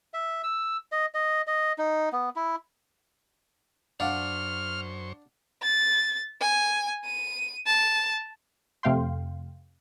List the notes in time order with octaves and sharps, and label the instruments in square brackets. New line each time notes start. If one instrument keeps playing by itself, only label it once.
[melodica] E5
E6
D#5
D#5
D#5
D#4
B3
E4
[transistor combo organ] F#2 C5 C#6 [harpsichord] D4 [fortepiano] D5 F5 F#5 [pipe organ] F6
[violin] A6
G#5
D#7
A5
[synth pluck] F2 C3 A3 F5 G5 C6